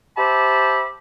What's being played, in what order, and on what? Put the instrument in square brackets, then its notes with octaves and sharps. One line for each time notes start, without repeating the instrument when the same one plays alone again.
[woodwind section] G4 C5 E5 A5 B5 D6